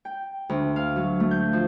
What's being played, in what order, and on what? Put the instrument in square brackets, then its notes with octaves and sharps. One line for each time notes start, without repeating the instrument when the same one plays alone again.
[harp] G5
D2
F5
F#3
A3
G6
F3